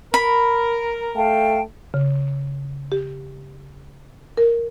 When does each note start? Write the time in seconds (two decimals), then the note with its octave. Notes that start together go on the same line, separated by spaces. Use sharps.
0.14 A#4 B5
1.16 A3 F5 G5 A5
1.94 C#3
2.92 G4
4.37 A#4